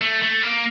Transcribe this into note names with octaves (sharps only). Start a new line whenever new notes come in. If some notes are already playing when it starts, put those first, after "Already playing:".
A3
A3
A#3